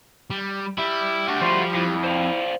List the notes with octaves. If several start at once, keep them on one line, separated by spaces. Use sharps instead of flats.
G3
G3 E4
A3 D4 F#4
F3 F4 C6
F2 E4
C5 D5 F5